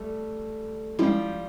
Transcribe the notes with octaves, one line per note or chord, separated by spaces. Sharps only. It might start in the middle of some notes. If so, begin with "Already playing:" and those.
Already playing: G3 A3
F3 G3 G#3 C#4 E4